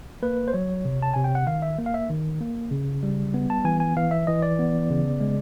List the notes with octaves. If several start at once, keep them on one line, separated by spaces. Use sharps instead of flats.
A#3 B4
C5
F#3 C#5
C3
A5
C3 G#5
G5
F#5
D#3 F5
E5
A#3
F5
E5
D#3
A#3
C#3
G3
B3
A5
E3 G#5
G#5
E3 F5
E5
E3 D#5
D5
B3
C#3
G#3